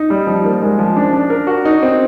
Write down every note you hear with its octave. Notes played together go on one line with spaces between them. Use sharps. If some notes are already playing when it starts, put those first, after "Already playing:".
Already playing: D#4
G3
F3
A#3
G#3
F3
D4
D4
A#4
F#4
D#4
C4